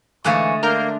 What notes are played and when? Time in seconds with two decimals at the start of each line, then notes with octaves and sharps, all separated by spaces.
0.24 G#2 D3 E3 G#3 A3 F5 C#6
0.63 A#3 D4 A#4 F6 G6